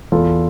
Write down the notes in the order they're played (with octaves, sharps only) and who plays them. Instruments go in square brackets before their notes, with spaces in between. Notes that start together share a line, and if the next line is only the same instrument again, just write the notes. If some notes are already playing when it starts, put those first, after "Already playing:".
[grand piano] E2 F4 A4